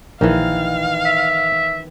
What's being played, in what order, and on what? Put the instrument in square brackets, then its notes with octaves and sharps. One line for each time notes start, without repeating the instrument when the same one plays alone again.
[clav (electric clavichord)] A#1 [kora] D#3 E3 [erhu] F5
[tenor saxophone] E5